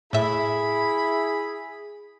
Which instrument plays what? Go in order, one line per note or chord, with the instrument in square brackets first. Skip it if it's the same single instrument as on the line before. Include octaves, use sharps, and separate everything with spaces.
[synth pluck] A2 E5 [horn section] E4 [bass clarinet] G#4 [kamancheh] B5